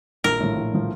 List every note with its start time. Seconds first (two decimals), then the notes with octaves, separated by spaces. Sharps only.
0.24 A#1 A#4
0.40 A2 F3
0.57 A#1
0.73 A2 F3